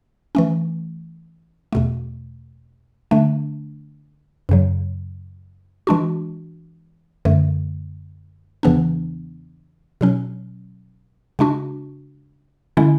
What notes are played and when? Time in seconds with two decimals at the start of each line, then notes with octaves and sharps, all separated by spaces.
0.35 E3 A3 C#4
1.73 E2 B2 A3
3.11 D3 A3 D4
4.49 F#2 C#3 F#3
5.87 E3 G#3 D4 F#4
7.25 F#2 D3 A3
8.63 E2 C#3 E3 B3 D4
10.01 B2 F#3 C#4
11.39 C#3 G#3 D4 F#4
12.77 D3 G#3 C#4 E4